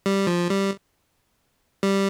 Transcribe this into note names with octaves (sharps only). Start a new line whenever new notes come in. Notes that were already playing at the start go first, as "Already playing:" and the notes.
G3
F3
G3
G3